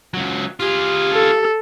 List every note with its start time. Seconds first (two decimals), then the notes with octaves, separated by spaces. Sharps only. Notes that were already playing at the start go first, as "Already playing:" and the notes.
0.14 C#2 F#3
0.60 F4 G4 G#4
1.13 A4